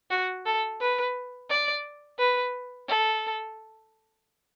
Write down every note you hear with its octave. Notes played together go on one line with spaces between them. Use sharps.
F#4
A4
B4
D5
B4
A4